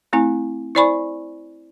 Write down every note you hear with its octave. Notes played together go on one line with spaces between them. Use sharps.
A3 C4 E4 G#5
E4 C5 D5 G#5 B5 C#6